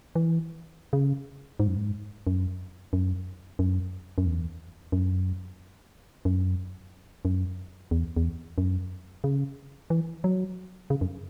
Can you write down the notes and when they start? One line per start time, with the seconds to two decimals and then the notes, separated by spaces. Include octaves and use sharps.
0.15 E3
0.93 C#3
1.60 G#2
1.68 F#2
1.76 G#2
2.27 F#2
2.93 F#2
3.59 F#2
4.18 F#2
4.26 E2
4.92 F#2
6.25 F#2
7.25 F#2
7.91 E2
8.17 E2
8.58 F#2
9.24 C#3
9.90 E3
10.24 F#3
10.90 C#3
11.01 F#2